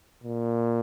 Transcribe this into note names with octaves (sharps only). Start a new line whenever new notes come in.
A#2